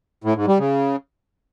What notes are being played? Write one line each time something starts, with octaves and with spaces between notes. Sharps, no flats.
A2
G#2
G3
C#3